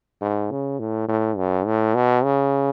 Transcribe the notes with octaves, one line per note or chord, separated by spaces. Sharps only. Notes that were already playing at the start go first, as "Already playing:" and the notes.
G#2
C#3
A2
A2
F#2
A2
B2
C#3